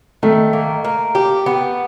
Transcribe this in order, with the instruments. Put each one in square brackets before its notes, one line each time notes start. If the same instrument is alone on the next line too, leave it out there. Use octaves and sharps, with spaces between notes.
[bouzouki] D#3 [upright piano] A3
[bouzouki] A#3
A#3
G4
B3